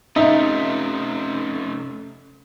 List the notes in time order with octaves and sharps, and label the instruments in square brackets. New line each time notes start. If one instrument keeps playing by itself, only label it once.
[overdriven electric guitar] C3 A3 [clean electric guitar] C#4 F5 [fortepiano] D#4 [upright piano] E5